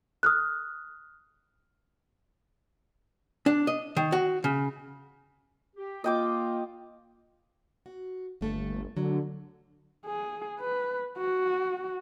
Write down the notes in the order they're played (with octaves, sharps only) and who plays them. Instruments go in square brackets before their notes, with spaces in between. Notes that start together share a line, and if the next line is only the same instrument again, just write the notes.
[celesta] D#6 F6 F#6
[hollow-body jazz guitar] D4
D#5
D#3
F#4
C#3
[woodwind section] G4
[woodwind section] A#3 F4 [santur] D#5 G5 D6
[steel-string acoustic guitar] F#4
[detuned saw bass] G1 [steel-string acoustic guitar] D#2 A3 A4
[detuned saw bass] D3 [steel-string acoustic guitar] F#3
[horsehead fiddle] G#4
B4
F#4